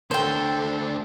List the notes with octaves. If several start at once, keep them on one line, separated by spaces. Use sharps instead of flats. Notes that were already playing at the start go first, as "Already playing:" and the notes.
D2 D3 A4 C5 G5